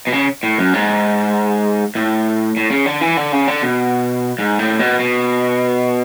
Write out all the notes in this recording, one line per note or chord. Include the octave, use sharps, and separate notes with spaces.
B2
C#3
A2
F#2
G#2
A2
A2
C#3
D3
E3
D3
C#3
D3
B2
G#2
A2
B2
B2